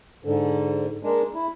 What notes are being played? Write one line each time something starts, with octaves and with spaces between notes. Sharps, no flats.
G#2 D3
G#3 A#3 D4
E4